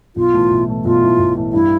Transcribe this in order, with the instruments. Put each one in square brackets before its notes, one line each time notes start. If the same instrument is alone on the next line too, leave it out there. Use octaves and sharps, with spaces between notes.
[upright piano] B1 [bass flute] F4
[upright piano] A2 E3 A3
B1
A2 E3 A3
[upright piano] B1 [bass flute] F4
[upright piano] A2 E3 A3
B1
A2 E3 A3
[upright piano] G2 [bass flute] E4